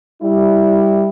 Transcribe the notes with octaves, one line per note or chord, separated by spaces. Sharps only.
G3 E4